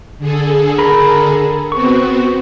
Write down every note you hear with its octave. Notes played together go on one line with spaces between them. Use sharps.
D3 G#4 A4
A#4 B5
B3 C4 F#4 C#6